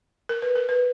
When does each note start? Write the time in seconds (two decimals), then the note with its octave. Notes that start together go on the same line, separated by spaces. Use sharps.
0.29 A#4
0.42 B4
0.55 A#4
0.69 B4